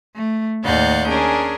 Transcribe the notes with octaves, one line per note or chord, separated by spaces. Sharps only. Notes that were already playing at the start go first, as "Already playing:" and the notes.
A3
D#2 A2 D5 F5 F#5 G6
C#4 D4 G#4 A#4